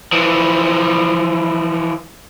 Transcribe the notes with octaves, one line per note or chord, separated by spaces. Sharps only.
E3 F3